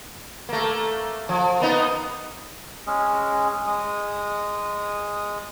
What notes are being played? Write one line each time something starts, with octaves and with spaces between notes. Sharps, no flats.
A3 A#3
F3
A#3 B3 D#4
G#3 C#4 G#4
G#3 D#6